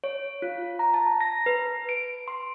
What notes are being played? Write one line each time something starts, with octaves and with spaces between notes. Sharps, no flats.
C#5
F4
A#5
A5
A#6
B4
D7
C6